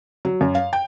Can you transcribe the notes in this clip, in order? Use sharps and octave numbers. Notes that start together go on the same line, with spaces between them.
F#3
F#2
F5
G5